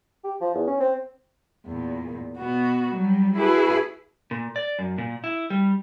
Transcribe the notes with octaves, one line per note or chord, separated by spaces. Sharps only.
G4
F3
E2
C#4
C4
E2 A#2
B2 B3 F#4
F#3 G3
E4 F#4 G#4 A4 B4
A#2
D5
F#2
A#2
E4
G3